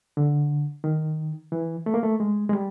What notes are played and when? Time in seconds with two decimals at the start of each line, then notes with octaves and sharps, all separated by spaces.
0.17 D3
0.84 D#3
1.52 E3
1.86 A3
1.94 A#3
2.03 A3
2.20 G#3
2.49 G#3
2.53 G3